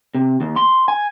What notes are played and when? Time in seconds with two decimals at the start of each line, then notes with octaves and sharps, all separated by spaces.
0.15 C3
0.41 D#2
0.56 C6
0.88 G#5